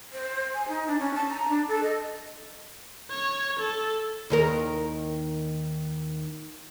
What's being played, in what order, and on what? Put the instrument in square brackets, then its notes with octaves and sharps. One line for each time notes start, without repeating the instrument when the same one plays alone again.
[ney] C5
G#5
D#4
D4
C#4
A5
A#5
D4
A4
D#5
[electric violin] C#5
A4
[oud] D#2 D#3 A#4